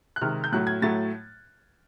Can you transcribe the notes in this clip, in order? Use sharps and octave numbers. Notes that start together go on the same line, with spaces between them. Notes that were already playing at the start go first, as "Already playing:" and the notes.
F#6
C3 D#3 G#3 F6
G6
A2 F#3 A3 F#6
G#6
A2 F#3 A3 A6